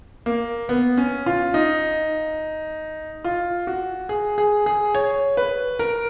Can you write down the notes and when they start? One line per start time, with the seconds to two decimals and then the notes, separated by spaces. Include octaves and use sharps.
0.26 A#3
0.69 B3
0.97 C#4
1.26 F4
1.54 D#4
3.25 F4
3.67 F#4
4.09 G#4
4.38 G#4
4.66 G#4
4.95 C#5
5.37 B4
5.79 A#4